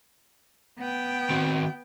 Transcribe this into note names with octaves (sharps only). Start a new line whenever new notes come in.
B3 G5
D#3 C4 F#4